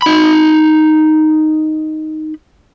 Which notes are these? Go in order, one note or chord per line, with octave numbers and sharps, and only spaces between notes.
D#4 B5